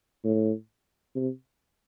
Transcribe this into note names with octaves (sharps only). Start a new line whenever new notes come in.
A2
C3